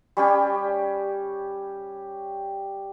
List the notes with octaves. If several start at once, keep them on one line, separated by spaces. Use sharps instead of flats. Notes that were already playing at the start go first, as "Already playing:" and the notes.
G3 C#4 G4